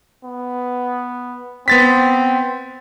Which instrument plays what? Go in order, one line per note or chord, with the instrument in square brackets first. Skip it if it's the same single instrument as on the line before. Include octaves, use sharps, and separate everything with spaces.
[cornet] B3
[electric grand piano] B3 A6 B6 [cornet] C4